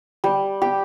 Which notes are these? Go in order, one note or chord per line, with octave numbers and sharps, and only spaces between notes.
G3
G4